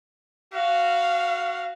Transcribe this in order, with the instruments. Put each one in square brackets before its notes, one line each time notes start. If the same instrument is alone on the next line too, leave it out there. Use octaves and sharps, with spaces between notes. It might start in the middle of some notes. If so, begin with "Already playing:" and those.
[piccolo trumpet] F#4 [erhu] F5